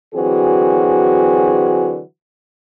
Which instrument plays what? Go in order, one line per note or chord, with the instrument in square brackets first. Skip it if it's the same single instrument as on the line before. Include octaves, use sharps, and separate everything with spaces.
[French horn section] D3 E3 F#3 C4 F#4 G#4